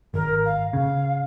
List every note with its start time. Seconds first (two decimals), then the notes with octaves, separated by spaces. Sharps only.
0.14 G#1 A#4
0.45 F5
0.73 C#3 F5